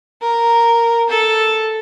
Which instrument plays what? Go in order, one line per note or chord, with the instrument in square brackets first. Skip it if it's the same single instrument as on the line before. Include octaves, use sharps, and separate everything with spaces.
[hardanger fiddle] A#4
A4